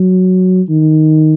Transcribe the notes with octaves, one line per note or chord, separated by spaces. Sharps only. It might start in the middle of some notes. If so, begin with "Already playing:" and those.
Already playing: F#3
D#3